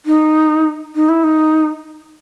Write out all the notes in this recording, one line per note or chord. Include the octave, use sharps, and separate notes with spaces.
D#4
D#4
E4
D#4